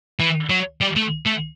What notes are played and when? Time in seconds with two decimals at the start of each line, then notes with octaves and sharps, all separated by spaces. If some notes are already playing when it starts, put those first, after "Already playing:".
0.20 E3
0.49 F#3
0.81 G3
0.96 A3
1.26 A3